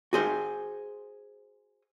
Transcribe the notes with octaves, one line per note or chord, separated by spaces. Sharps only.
F#4 G#4 C5